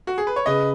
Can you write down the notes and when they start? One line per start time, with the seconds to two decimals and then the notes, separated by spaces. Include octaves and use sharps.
0.07 F#4
0.18 G#4
0.27 B4
0.36 C#5
0.46 C#3 B4 D#5